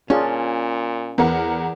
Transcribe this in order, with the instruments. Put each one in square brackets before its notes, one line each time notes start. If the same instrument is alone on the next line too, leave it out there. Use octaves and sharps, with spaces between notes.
[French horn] A#2 [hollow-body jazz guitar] C#4 [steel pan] D4 F4 G#4
[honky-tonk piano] E2 A#4 F#5 [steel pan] B3